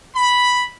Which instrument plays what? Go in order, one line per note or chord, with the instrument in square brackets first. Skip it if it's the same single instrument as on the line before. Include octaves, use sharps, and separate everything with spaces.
[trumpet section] B5